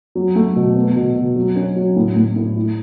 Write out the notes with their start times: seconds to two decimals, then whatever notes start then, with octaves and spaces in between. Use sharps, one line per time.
0.15 F#3
0.35 A3
0.56 B2
0.76 B3
0.96 B2
1.16 B2
1.36 F#3
1.56 C#4
1.76 F#3
1.96 A2
2.16 A2
2.36 A2
2.56 E4